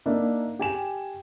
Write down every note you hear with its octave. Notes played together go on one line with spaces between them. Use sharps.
A#3 D4 D#4 E5
G4 G#5 E7